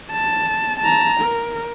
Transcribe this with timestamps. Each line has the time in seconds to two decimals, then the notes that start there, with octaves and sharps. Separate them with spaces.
0.11 A5
0.80 A5 A#5
1.21 A#4